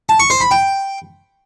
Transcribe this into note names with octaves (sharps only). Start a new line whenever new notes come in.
A5
C#6
C5
B5
G5